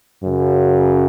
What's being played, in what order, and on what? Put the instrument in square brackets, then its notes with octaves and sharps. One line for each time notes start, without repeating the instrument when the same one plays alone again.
[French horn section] F#2 C#3 F#3